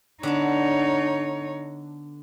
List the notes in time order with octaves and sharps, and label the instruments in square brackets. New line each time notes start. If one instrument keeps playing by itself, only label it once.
[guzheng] D3 B3 D4 [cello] D#4 C#5